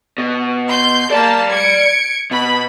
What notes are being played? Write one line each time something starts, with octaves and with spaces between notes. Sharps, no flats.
B2
C6 G6
A#3 D5 A5 B5
G#6 C#7 D7
B2 B5